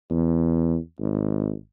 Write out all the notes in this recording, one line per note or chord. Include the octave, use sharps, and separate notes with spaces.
E2
G#1